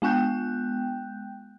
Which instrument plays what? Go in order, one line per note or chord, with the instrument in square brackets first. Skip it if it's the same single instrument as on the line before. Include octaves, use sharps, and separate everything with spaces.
[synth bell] G#3 B3 G5 F#6 G6